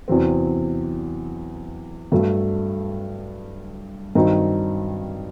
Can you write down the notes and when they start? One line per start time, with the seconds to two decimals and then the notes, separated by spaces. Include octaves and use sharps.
0.08 E2 C3 F#3 C4
2.12 G2 F#3 A3
4.15 G2 D#3 F#3 C4 D#4